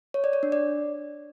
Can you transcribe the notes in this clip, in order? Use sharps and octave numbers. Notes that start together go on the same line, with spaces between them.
C#5
D5
C#5
D4
D5